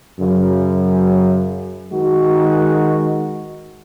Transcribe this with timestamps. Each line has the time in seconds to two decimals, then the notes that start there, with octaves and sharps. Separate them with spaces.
0.18 F#2 C#3 F#3
1.92 D#3 G#3 D#4 F#4